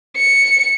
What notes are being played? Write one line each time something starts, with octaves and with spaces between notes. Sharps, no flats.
C#7